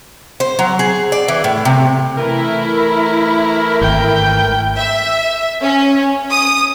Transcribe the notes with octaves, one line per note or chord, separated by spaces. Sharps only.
C5
F#3
G#4
D5
E3
A2
C3
E3 A3 E4 A#4
G#1 G5 G6
E5
C#4
D#6